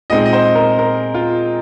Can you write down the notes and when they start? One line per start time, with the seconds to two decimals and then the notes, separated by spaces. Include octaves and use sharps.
0.10 A#2 G#3 C4 D#4 D#5
0.25 D#5
0.33 C5
0.55 A#4
0.79 A#4
1.14 F4